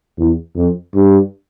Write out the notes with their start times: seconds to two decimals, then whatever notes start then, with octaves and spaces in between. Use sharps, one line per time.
0.18 E2
0.56 F2
0.94 G2